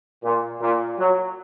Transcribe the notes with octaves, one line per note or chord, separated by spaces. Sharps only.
A#2
A#2
F#3